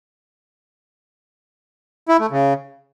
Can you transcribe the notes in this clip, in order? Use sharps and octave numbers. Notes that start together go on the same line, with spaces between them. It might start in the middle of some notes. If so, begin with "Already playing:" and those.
E4
A3
C#3